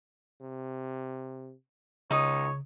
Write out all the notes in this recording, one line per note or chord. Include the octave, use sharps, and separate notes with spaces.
C3
C#2 C#3 D#4 C#5 D#6